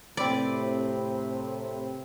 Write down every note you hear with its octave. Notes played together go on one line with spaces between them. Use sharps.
A2 C3 C4 B4 D5